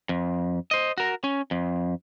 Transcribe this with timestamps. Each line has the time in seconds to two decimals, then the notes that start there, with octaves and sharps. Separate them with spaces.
0.09 F2
0.71 C5 D#5
0.98 F#4 A#4
1.24 C#4
1.51 F2